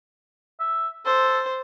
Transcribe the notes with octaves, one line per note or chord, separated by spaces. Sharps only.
E5
A4 C5